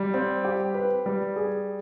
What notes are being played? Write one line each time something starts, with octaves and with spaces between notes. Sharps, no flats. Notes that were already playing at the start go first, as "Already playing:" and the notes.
Already playing: G3
C4
G4
B4
G3
G#4